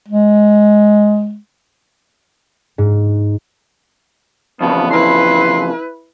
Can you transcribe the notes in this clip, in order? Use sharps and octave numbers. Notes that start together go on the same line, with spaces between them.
G#3
G#2
F2 C#3 E3 B3
E4 B4 C6